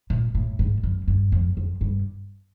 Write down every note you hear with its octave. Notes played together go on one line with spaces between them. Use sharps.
A#2
A2
G#2
F#2
G2
F2
F2
G2